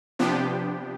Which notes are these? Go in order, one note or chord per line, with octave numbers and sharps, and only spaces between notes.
C3 F3 B3 D4 G4